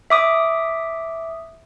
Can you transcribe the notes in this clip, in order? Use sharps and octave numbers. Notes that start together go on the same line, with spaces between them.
E5 D6 D#6